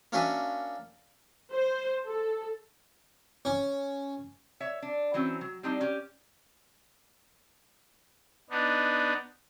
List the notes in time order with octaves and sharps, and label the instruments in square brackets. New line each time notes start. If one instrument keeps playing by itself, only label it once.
[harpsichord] A#3 C#4 D4 F#4 E5 G#5
[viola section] C5
A4
[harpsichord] C#4
[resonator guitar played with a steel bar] C#5 E5
D4
E3 F#3 C4 C#4
F#3
G3 C4 D4 D#4
C#4 G4
[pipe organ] B3 D4 D#4